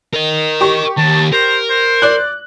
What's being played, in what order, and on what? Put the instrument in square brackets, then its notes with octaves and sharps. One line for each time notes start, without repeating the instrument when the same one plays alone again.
[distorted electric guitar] A#4 D#5
[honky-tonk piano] G4 C#6
[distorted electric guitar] D#2 [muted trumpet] A5
[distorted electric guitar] A#4 [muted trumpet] C5
[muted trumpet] C5
[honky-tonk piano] D5 F#6